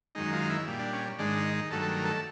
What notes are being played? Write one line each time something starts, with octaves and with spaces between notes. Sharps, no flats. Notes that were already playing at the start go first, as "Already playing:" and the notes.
F#2 D#3 G#3 D#4
F4
E4
A#2 G3
D4
C#4
G#2 D#3 G#3 D4
D#4
D#4
G2 D#3 F#3 A3 A4
A4
A#4
A4